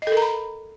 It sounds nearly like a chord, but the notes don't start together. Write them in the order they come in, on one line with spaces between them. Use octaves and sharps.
D#5 A4 A#4 A#5 B5